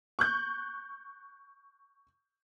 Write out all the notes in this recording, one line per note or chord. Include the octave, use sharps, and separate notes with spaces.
C#6 F#6 G6